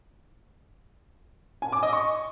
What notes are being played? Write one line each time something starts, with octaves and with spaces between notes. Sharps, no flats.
G#5
D6
D#5
C#6